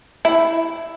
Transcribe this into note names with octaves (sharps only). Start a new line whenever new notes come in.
E4